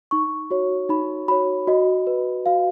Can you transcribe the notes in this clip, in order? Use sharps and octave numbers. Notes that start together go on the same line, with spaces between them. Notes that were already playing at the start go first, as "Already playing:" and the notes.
D#4 C#6
F#4 C#5
D#4 B5
F#4 C#5 B5
F#4 D#5
B4
F#4 F5